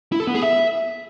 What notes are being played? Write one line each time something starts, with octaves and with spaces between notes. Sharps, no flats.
E4
A4
B3
G#4
E5